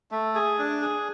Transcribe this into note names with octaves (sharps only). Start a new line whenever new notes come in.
A3
G#4
D4
G#4